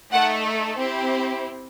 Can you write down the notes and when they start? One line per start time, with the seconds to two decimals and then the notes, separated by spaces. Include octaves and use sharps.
0.11 A3 D#4 A4 F#5
0.77 C4 E4 G4